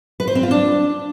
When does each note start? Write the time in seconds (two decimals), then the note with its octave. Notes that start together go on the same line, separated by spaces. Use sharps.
0.20 B4
0.28 C5
0.35 C4
0.43 F4
0.51 D4